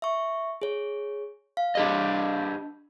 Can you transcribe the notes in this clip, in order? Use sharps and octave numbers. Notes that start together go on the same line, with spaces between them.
E5 C#6
G#4 C#5
F5
D4 G4 D#5